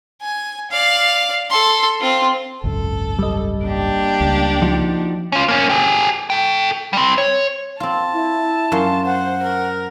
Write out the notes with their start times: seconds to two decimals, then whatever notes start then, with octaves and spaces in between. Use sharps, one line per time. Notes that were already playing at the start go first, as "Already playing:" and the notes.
0.21 G#5
0.71 D5 F5
1.50 A4 C6
2.00 C4 F4
2.64 G#1 C#2 F#2 A4
3.19 G3 D#5
3.64 A#3 D4 G4
4.21 C#2
4.62 F3 D#4 F#4
5.32 C#4 F4
5.48 A#3 C#4
5.70 G4 G#4
6.30 A4 G5
6.93 G3 C4
7.18 C#5
7.80 C4 F4 A5
8.13 E4
8.72 F#2 F4 C6
9.06 C5 F#5
9.43 A#4